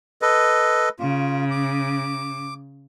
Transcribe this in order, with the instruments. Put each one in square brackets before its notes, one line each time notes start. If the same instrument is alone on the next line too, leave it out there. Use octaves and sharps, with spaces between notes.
[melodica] A4 B4 D#5
[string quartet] C#3 [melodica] F4
[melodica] D6